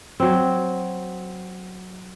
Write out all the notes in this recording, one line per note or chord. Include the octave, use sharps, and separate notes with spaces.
F#3 C4